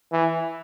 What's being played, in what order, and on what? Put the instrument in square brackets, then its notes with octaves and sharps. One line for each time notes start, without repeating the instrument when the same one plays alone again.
[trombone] E3